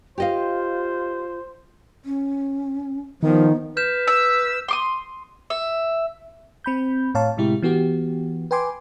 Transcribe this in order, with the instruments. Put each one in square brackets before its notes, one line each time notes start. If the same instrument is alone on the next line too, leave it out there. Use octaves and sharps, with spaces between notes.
[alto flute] F4 [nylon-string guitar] G4 D#5 F5 [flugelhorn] C5
[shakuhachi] C#4
[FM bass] D#3 [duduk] F3 [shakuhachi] B3 [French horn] D#4
[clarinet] B4 [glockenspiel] F6 G6 E7
[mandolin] E5 [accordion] E6
[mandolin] C6 D6 D#6
E5
[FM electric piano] C4 B5 G6
A2 C#5 F5 A5
A2 C3 G#3 E4 G4
E3 B3 F#4 G4
B4 G5 G#5 C6 D6